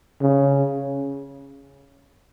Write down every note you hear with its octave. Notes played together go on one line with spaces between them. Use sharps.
C#3